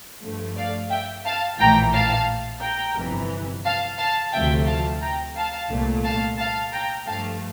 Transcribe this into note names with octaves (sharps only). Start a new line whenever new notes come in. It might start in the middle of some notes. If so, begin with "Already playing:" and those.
G2 F3 A3
D5 F5
E5 G5
F5 A5
A#1 A2 E3 G5 A#5
F5 A5
G5 A#5
G1 F2 C3 E3
F5 A5
F5 A5
D2 C3 F3 A3 E5 G5
F5 A5
G5 A#5
F5 A5
C2 A#2 A3
F5 A5
F5 A5
G5 A#5
G2 F3 A3 F5 A5